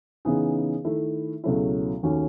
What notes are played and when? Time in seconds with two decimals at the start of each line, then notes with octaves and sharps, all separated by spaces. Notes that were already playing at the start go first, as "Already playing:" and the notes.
0.25 C#3 E3 B3 D#4 G#4
0.85 D#3 A3 E4
1.44 C#2 B2 F#3 A3 E4
2.03 D#2 D#3 A3 C#4 F#4